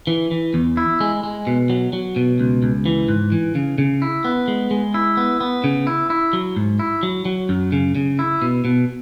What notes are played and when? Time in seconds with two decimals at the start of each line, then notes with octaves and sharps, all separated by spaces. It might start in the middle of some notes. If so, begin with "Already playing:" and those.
0.07 E3
0.31 E3
0.54 E2
0.77 E4
1.01 G#3
1.23 G#3
1.47 B2
1.70 F#3
1.93 F#3
2.16 B2
2.40 C#2
2.63 C#2
2.86 E3
3.08 G#2
3.32 E3
3.55 C#3
3.78 C#3
4.02 E4
4.25 B3
4.48 G#3
4.71 G#3
4.94 E4
5.17 B3
5.40 B3
5.64 C#3
5.87 E4
6.10 E4
6.33 F#3
6.56 G#2
6.79 E4
7.03 F#3
7.25 F#3
7.49 F#2
7.72 C#3
7.95 C#3
8.19 E4
8.42 B2
8.65 B2